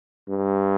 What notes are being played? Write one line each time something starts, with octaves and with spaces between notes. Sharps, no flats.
G2